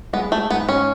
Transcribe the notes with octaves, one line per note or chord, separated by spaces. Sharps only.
G#3 B3
A3
G#2 B3
C#4